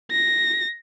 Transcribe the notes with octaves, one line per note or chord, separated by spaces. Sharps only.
A#6